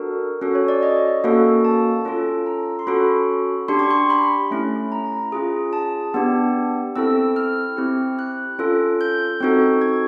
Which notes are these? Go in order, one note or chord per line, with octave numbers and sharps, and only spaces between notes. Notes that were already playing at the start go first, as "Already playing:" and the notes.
Already playing: D4 F#4 A4 A#4
C#4 F#4 A4
C#5
D5
D#5
A#3 C#4 F#4 A4
A5
C#4 F4 A4
A#5
C6
C#4 F#4 A4 B5
D4 G4 C6
C#6
C6
B5
A3 C#4 E4
A#5
C#4 F4 G#4
A5
B3 D4 G4
C4 E4 A4 E6
F6
C4 E4 G4
F#6
C#4 F4 A4
G6
C4 D#4 F#4 A4
G#6